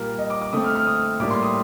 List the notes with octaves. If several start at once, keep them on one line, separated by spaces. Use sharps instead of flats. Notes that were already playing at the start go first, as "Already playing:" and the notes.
Already playing: A#2 G3 A#3 A#4
D#5
D6
D6
D3 A3 C4 D#6
F6
F6
D#6
A2 G3 A#3 D4 D6
C6
D#6